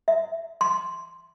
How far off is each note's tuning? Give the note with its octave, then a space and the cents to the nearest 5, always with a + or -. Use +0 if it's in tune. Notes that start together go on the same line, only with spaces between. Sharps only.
E5 +0
C6 +0